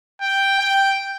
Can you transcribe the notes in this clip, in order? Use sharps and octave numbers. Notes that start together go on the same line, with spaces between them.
G5
G5